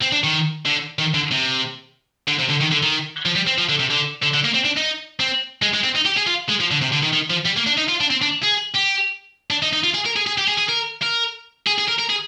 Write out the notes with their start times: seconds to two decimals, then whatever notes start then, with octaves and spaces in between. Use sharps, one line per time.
0.02 C4
0.12 D4
0.24 D#3
0.66 D3
0.99 D#3
1.15 D3
1.32 C3
2.28 D3
2.39 C3
2.49 D3
2.60 D#3
2.71 D3
2.83 D#3
3.26 F3
3.35 G3
3.47 C4
3.58 F3
3.69 D3
3.80 C3
3.90 D3
4.23 D3
4.34 D3
4.44 A#3
4.54 C4
4.65 D4
4.77 D#4
5.20 C4
5.62 G#3
5.74 G#3
5.84 C4
5.96 D#4
6.06 G4
6.17 G#4
6.27 F4
6.49 G#3
6.60 F3
6.71 D3
6.82 C3
6.93 D3
7.03 D#3
7.13 D#3
7.30 F3
7.46 G3
7.57 A#3
7.67 D4
7.78 D#4
7.89 F4
8.01 D4
8.10 C4
8.22 D4
8.43 G#4
8.75 G4
9.50 D4
9.62 D#4
9.73 D#4
9.84 F4
9.94 G#4
10.06 A#4
10.16 G#4
10.27 G#4
10.38 G4
10.48 G#4
10.58 G#4
10.69 A#4
11.03 A#4
11.67 G#4
11.78 G#4
11.88 A#4
11.99 A#4
12.09 G#4